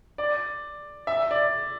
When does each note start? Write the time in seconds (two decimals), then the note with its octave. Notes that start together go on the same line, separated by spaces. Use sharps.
0.18 D5
1.07 E5
1.31 D5